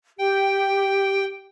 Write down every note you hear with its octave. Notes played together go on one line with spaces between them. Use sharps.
G4 G5